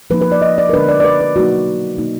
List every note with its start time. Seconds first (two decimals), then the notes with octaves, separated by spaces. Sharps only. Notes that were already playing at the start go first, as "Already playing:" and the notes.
0.10 F3 A#3 D#4 B4
0.22 B4
0.32 D5
0.42 D#5
0.58 D5
0.69 A#4
0.74 D3 G#3 B3 D4 B4
0.89 D5
1.00 D5
1.04 B4
1.21 B4
1.36 B2 F#3 A#3 D#4 F#4
1.97 B2 A#3 D#4